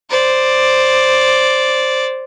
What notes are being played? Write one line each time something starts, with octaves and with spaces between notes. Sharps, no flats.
C5 D5